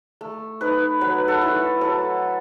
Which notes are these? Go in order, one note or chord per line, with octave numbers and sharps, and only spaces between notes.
A3
D#4 B4
F#3 B4
A4
A3 E4
F#3 A4